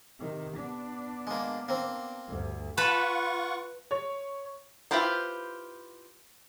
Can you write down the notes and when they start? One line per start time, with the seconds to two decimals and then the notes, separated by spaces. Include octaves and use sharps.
0.20 C3 D#3
0.57 B3 D4
1.27 G#3 A#3
1.68 A#3 C4
2.27 D2 G2
2.77 F4 B4 F#5 A5 B5 C#6
3.91 C#5
4.91 E4 F4 G4 B4 C5